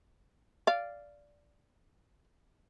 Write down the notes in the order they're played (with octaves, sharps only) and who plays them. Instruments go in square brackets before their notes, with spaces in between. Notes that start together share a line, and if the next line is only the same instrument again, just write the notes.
[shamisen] D5 F5